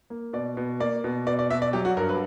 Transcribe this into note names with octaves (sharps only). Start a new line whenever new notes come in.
A#3
B2 D5
B2
A#3 D5
B2
B2 D5
D5
B2 E5
D5
F#3 G4
F#4
G2 A#4
B4